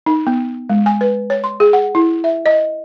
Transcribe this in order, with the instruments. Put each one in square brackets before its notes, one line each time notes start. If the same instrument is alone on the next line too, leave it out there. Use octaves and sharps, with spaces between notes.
[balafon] D#4
B3
G#3
G#5
B4
C#5
C6
G#4
F#5
E4
E5
D#5